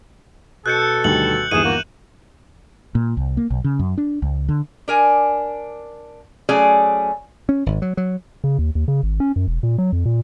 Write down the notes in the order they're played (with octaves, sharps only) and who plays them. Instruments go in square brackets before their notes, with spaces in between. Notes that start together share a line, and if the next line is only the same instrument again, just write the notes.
[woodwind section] B2 A4 [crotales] F#6 G6 C#7
[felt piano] D2 D#3 G3 [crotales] F#7
[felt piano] G1 D#2 E3 [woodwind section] G#4 [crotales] D#7 E7
[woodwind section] A#3 F#4
[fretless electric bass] A#2
C2
A#3
B1
C#3
F#2
D4
C#2
D3
[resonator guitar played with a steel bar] D4 A#4 G#5
F#3 A3 C#4 G#4 D5
[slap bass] C#4
G#1
F#3
F#3
[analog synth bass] C#3
D#2
D#2
C#3
G#1
C#4
F#2
E1
A#2
F#3
F2
A#2